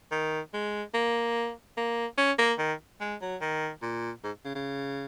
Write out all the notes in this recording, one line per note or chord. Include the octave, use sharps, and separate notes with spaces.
D#3
G#3
A#3
A#3
C#4
A#3
D#3
G#3
F#3
D#3
A#2
G#2
C#3
C#3